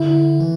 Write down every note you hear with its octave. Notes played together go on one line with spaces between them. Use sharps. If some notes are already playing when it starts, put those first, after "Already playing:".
Already playing: D3 E4
E3